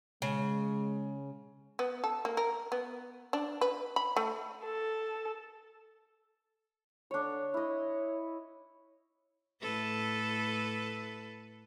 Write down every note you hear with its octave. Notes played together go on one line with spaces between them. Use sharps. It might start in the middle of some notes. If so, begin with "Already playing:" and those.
C#3 G#3
B3
A4
A#3
A#4
B3
D4
B4
B5
A3
A4
D3 D4 C#5
E4 C#5 D#5
A2 A4 B4